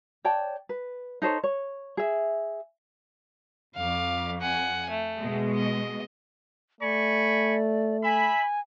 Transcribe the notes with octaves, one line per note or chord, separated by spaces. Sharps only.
C#5 D5 G5 A5
B4
D#4 A4 C5 C#5
C#5
G#4 E5
F2 F5 D6
F#5 G#5
A3
B2 G#3
D#5
A3 D5 G#5 B5 C#6
E5 G#5 B5